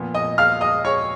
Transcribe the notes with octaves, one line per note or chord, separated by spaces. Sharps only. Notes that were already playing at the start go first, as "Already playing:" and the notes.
Already playing: A#2 F3 B3
D#5 D#6
F5 F6
D#5 D#6
C#5 C#6